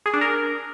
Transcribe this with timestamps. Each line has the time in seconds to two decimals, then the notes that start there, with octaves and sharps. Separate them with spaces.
0.06 G#4
0.13 D4
0.21 A#4